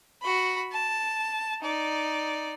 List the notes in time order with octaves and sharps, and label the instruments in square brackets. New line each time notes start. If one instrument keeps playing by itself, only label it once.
[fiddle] F#4 B5
A5
D#4 D5